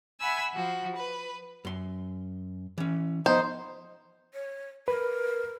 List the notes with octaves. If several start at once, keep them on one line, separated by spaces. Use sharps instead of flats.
E5 F#5 G#5 B5 E6
F3 F#4
B4
F#2 C6
E3 C#4
F3 B3 D#4 C5
C#5
A#4 B4